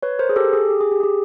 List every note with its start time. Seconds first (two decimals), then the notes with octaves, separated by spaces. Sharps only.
0.03 B4 C#5
0.19 A#4 C5
0.29 G#4
0.36 G4 A4
0.53 G#4
0.70 G4
0.81 G#4
0.91 G4
1.00 G#4
1.03 G4